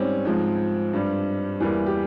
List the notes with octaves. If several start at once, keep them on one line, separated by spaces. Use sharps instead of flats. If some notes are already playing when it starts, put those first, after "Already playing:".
Already playing: G#2 G3 C4 C#4
G#2 F3 G#3
G2 G3
E2 E3 G3 A#3
G4